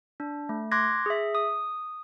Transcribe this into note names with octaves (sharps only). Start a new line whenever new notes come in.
D4
A3
C6 D6 F#6 G#6 A#6
G#4 E5
D#6